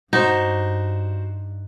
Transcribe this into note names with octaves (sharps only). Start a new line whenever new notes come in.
G2 D#4 F#4 C5